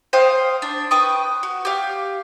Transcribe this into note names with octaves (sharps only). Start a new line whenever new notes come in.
C5 F5 G5 D#6
D4
B4 G5 C#6 D#6
F#4
G4 F5